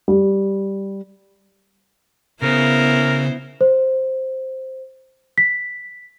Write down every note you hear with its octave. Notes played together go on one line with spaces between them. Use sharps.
G3
C#3 B3 E4 A#4 C5
C5
B6